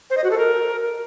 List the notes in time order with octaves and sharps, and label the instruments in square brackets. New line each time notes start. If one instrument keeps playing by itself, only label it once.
[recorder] C5
D#5
F#4
A4
A#4